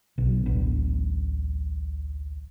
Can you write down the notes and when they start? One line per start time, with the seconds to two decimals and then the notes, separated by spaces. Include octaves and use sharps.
0.18 B1 B2
0.46 D1 A1 B3 D4